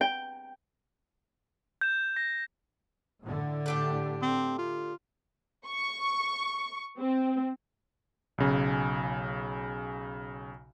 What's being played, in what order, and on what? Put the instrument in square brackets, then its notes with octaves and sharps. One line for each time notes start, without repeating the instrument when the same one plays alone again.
[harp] G5
[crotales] G6 E7
A#6
[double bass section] A2 D3
[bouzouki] A3 D4 G4
[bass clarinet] C4
F4
[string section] C#6
C4
[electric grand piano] B1 C#3 G#5